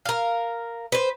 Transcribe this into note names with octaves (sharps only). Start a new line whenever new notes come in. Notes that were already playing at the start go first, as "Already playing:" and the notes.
A#4 F5
B4 C5